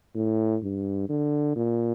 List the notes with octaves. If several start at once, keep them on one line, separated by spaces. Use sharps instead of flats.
A2
G2
D3
A#2